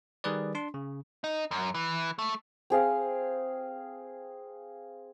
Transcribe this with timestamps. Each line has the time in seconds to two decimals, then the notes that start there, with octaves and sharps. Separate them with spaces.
0.24 D#3 G3 G#4 B4 D5
0.55 D4 C6
0.74 C#3
1.24 D#4
1.51 F#2
1.75 E3
2.19 A3
2.70 C4 G#4 F5